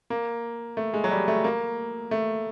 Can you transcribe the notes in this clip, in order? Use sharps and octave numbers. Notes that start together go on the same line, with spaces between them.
A#3
A3
G#3
F#3
G3
A3
A#3
A3